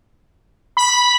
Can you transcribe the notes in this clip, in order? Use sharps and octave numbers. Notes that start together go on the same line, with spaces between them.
B5